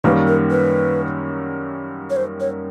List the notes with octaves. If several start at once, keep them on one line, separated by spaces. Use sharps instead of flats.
F#2 D#3 G3 A#3 C#4 B4
A#4
B4
C#5
C5
C#5